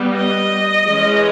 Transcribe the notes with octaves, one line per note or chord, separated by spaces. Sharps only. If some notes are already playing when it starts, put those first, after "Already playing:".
Already playing: G3 B3
D#5
E3 G#3 C#4